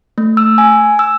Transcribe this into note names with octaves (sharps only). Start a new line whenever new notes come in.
A3
E6
G#5
E6